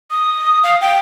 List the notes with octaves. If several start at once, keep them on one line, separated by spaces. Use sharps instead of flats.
D#6
F5
G5